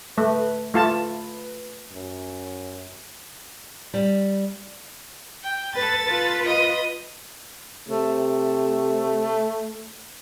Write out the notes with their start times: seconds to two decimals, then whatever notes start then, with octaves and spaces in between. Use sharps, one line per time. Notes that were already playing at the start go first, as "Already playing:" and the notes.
0.18 A3 B4
0.74 A3 F4 B4 A5
1.92 F#2
3.94 G3
5.43 G5
5.75 A4 B4 A6
6.05 F4 B4
6.45 D#5 D#7
7.89 C3 A3